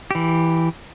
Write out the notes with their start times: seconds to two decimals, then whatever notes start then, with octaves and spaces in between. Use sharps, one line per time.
0.11 E3 G4